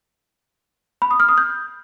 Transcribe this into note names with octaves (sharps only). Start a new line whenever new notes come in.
B5
D#6
F6
D#6
G6